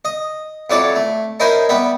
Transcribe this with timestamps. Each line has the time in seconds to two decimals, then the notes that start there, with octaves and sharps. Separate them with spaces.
0.05 D#5
0.70 F2 E3 F#3 C#5 D5 D6
0.96 A3
1.40 C#4 D#4 E4 A#4 C5 G#5
1.69 G3 B3 E5